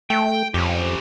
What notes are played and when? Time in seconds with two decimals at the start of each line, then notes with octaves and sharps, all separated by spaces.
0.10 A3 G5
0.54 F2 C#4 G4